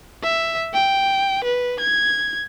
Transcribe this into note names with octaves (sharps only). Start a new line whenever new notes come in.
E5
G5
B4
G#6